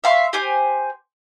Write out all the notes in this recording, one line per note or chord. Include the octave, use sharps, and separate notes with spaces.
E5 F5 C6 C#6
G4 C5 G#5